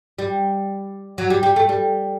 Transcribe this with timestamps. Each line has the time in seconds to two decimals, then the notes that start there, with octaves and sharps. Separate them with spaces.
0.19 G3
1.18 F#3
1.30 G3
1.43 G3
1.56 A3
1.69 G3